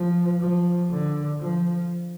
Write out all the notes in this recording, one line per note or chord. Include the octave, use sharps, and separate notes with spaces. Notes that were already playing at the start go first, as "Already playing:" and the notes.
Already playing: F3
F3
D3
F3